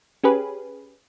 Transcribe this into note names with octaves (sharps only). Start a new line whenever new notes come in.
C#4 G4 G#4 B4